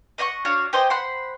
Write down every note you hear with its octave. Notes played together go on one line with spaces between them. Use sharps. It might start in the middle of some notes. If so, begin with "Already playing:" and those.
D#5 E5 F#5 C#6
D4 F#4 C#5 F5
G4 C5 D#5 G#5
C5 F#5 B5 C6